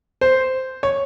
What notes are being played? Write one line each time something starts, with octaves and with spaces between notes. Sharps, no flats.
C5
C#5